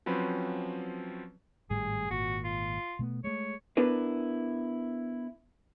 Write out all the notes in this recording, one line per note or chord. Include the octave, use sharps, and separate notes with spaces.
F3 F#3 C4 C#4 B4
G#1 A2 G3 G#4
G#1 A#2 F#4
F4
B2 A3 B3
G#3 A3 C#5
B3 D4 E4 A#4 B4